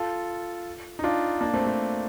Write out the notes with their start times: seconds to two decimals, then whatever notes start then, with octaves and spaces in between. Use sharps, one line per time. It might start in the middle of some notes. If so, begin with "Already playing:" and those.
Already playing: F4 A4
0.99 D#4
1.04 D4 F4
1.41 A#3 D4
1.54 A3 C4
1.66 A3